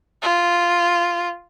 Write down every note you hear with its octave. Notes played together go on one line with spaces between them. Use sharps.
F4